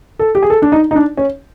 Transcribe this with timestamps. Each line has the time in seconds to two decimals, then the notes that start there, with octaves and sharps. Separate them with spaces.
0.19 A4
0.35 G4
0.42 G#4
0.50 A4
0.62 D4
0.72 D#4
0.91 D#4
0.95 D4
1.17 C#4